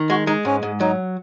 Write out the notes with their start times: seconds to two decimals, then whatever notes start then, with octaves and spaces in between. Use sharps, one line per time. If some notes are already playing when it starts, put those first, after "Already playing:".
Already playing: D#3
0.10 G#3 F#4
0.27 G#3 D#4
0.45 G#2 C#4
0.63 G#2
0.80 F#3 D#4